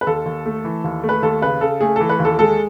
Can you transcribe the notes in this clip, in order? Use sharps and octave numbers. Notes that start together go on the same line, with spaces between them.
B4
D#2 A4
D#2
A3
E3
D#2
A3
B4
D#2 A4
C#3 B4
C#3 A4
A3 G#4
E3 A4
B4
D#2
A4
G#3 A4